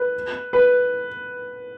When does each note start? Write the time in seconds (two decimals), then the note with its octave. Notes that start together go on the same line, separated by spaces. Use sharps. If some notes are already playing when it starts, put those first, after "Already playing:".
Already playing: B4
0.53 B4